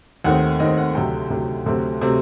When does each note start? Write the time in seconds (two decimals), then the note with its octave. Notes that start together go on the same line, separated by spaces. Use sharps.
0.24 D#2 D#3 A3 C4 F#5
0.60 D#2 D#3 A3 C4 D#5
0.77 F#5
0.95 D2 C3 F#3 A3 G5
1.30 D2 C3 F#3 A3
1.66 D2 C3 F#3 A3 C4
2.01 C3 F#3 A3 C4